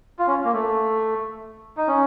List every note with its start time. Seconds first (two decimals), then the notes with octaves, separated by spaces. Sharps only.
0.19 F4
0.27 C#4
0.44 A#3
0.53 A3
1.77 D#4
1.88 C#4